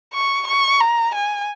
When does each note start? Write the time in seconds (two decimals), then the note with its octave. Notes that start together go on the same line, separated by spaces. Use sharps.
0.14 C#6
0.47 C#6
0.80 A#5
1.14 G#5